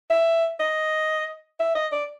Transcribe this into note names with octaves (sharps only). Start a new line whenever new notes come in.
E5
D#5
E5
D#5
D5